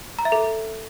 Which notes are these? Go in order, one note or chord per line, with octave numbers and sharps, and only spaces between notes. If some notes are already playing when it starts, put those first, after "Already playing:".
A#5
E5
A4